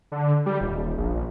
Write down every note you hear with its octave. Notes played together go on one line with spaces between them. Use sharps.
D3
G3
D#1
A#1